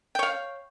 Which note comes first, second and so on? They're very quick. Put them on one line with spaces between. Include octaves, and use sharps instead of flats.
G5 C#5 F5